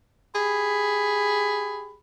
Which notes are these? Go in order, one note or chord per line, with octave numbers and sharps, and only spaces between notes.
G4 G#4 B5